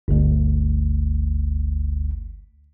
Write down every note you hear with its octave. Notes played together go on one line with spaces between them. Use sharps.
G1 D2